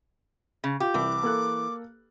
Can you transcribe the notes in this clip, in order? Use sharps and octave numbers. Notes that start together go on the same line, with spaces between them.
C#3
F4 G4
C2 E3 D6
A#3 A4 F#6